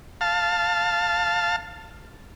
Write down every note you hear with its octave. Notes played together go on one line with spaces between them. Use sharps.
F5 A5